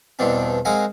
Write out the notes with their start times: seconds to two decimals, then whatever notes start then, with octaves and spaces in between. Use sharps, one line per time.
0.19 E2 G2 B2 C4 D4
0.65 G#3 C4 A#4 F5 F#5 G#5